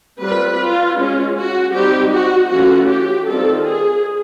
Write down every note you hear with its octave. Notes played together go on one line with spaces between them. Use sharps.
G3 C4 F4 B4
F4
G#3 C#4 F4
F#4
G3 C4 D#4 G4
F#4
E3 A3 C#4 F4 F#4
G4
D#3 G3 C4 F4 A4
G#4